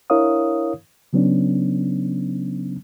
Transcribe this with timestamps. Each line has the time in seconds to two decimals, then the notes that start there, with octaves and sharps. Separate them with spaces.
0.10 D4 E4 A#4 C#5 F5 D#6
1.13 C#3 F#3 B3 C#4 D4